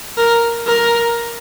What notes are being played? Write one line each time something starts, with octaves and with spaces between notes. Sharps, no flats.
A#4
A#4